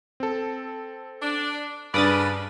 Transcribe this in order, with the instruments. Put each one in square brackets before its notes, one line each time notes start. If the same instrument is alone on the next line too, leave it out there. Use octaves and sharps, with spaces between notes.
[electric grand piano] C4 A4
[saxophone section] D4
[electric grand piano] G2 D4 [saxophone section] C#3 A#4 B4 [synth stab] D5 D#6 A6